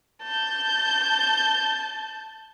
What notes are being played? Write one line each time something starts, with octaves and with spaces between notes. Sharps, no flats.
A5 G6